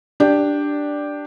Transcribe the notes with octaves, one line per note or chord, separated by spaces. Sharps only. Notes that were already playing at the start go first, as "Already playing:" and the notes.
D4 G4